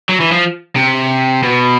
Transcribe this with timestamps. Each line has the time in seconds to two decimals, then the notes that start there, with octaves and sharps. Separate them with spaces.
0.09 F#3
0.20 E3
0.32 F3
0.76 C3
1.43 B2